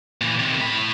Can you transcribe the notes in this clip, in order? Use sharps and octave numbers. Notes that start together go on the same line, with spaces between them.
A#2 E3
C3 D#3
A2 B5